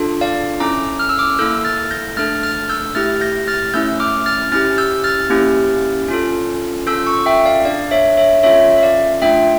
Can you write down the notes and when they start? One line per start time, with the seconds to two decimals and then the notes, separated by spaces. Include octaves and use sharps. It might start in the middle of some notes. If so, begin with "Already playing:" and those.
Already playing: D4 F4 A4
0.21 D5 F5
0.60 C#4 E4 A4 A#5 D6
0.99 F6
1.09 E6
1.19 D6 F6
1.38 A#3 E4 A4 E6 G6
1.65 F6 A6
1.91 G6 A#6
2.17 A3 D4 A4 F6 A6
2.43 F6 A6
2.69 E6 G6
2.95 A3 E4 G4 F6 A6
3.21 G6 A#6
3.48 F6 A6
3.74 A3 C#4 E4 E6 G6
4.00 D6 F6
4.26 F6 A6
4.52 C#4 E4 G4 F6 A6
4.78 E6 G6
5.04 F6 A6
5.30 A#3 C#4 E4 G4
6.08 C#4 F4 A4
6.87 C#4 F4 A4 E6 G6
7.06 C#6 E6
7.26 E5 G5
7.46 D5 F5
7.65 D4 A4 D5 F5
7.91 C#5 E5
8.17 C#5 E5
8.43 C#4 F4 A4 C#5 E5
8.76 E5
8.82 D5 F5
9.22 A3 D4 F4 E5 G5